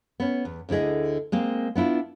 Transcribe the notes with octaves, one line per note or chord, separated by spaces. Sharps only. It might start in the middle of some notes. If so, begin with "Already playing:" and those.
B3 C#4
E2
D2 D3 E4 G#4 D#5
G#3 A#3 C4
B3 D4 E4 F4